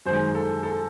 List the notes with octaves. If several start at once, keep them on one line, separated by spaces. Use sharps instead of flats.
F#2 D#3 G#3 C5
A4
A4